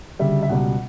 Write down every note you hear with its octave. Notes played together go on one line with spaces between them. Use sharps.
D2 C#3 G3 E5
E5
C#2 B2 G3 F#5